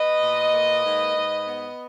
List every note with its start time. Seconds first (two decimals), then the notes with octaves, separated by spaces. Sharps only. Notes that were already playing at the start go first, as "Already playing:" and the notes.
Already playing: B4 D#5
0.22 A#2
0.54 A#3
0.84 G#2
1.17 G#2
1.48 B3